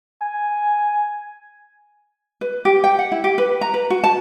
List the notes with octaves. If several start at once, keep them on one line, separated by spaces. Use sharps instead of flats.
G#5
B4
G4
G5
F#5
E4
G4
B4
A#5
B4
F#4
A5